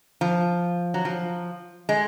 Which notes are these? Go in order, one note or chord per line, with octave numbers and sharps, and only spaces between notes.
F3
F#3
F3
G#3